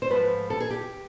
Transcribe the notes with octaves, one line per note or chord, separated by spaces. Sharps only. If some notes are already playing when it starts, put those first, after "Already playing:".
C5
G#2 F3 A3 C4 B4
A4
G#4
G4